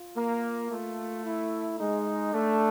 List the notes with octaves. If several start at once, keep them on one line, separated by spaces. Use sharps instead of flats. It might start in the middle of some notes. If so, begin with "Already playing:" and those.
Already playing: F4
A#3
A3 F4
E4
G#3 D#4
A3 D4